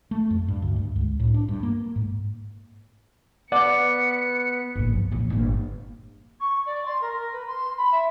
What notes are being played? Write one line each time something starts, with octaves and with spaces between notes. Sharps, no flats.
A3
F2
G2
D2
G2
C#2
A2
D4
G2
A#3
G#2
B3 D5 F#5 C#7
G1 A#2
F3
A#1 E2
G1 A#2
C#6
D5
C6
A#4
A#4
B4
C6
B5
E5